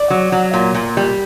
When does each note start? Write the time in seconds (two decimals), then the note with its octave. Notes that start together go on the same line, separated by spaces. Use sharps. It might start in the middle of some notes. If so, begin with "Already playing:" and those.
Already playing: D5
0.10 F#3
0.32 F#3
0.54 A#2
0.75 A#2
0.97 G3